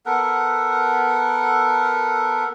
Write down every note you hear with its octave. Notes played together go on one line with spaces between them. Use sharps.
B3 A4 A#4 F#5